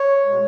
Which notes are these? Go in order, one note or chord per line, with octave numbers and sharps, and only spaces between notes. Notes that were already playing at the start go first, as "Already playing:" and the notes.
Already playing: C#5
B2 G#3